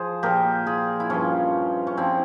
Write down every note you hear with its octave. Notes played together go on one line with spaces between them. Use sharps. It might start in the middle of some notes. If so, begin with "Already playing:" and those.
Already playing: F3 G#4 C5
A#2 F3 G4 A#4
F4 G#4
E4
G2 F3 C#4 F4
C#4
G2 F3 C4 E4